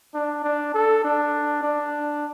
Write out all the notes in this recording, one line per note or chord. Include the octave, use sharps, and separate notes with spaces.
D4
D4
A4
D4
D4